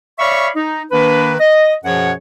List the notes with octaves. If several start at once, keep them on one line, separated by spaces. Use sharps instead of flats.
C#5 D5 E5 F5 B5 C#6
D#4
D#3 A#3 D4 B4
D#5
F#2 B2 F3 G#4 C#5 F#5